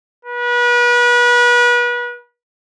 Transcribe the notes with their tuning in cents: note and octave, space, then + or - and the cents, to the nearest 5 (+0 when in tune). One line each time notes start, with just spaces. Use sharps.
B4 -35